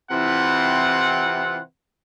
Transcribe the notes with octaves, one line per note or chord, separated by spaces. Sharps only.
C3 E3 C4 E4 F4 F#5